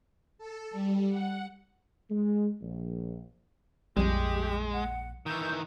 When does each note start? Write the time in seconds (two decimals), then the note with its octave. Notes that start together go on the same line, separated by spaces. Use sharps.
0.38 A4
0.71 G3
1.09 F#5
2.10 G#3
2.62 A#1
3.97 A#1 F2 G3 G#3 E4 G4
4.73 F#5
5.26 D#3 E3 G6